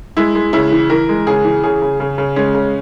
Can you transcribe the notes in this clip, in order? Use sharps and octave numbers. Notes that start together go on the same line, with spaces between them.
G#3 E4
G#3
C#3 E4
E3
E3 A#4
G#3
C#3 G#4
E3
C#3 G#4
C#3
C#3
C#3
G#3 C#4
C#3